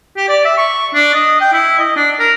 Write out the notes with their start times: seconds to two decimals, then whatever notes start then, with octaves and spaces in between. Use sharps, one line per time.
0.17 G4
0.29 D5
0.45 E5
0.57 C#6
0.94 D4
1.14 D#5
1.41 G5
1.53 E4
1.79 D#5
1.96 D4
2.20 A#4